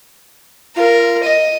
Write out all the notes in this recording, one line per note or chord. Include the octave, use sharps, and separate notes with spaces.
F4 A#4
D#5